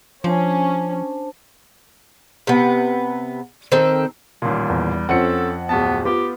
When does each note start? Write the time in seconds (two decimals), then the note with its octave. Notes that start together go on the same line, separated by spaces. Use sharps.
0.24 F3 C#4 D4 C5 A5
2.47 C3 B3
3.72 D#3 C4 A4
4.42 A1 D#2 A#2 G3
4.69 E2
5.09 F2 C4 C#4 A4 F#5 C#7
5.69 D1 B3 A5
6.05 B3 F4 G4